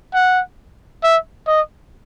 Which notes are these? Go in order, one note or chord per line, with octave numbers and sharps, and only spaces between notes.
F#5
E5
D#5